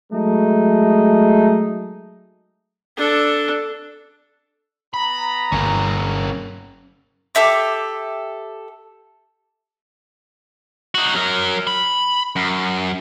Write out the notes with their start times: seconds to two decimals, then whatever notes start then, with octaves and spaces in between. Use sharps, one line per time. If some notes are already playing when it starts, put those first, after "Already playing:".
0.12 F#3 G#3 A3 D#4
2.97 D4 A4
4.94 B3 A#5 B5
5.52 G1 G2 B2 A#3 C#4
7.35 G4 A4 E5 D6
10.95 D#4 F#4
11.15 F#3 A#4
11.67 B5
12.36 F#2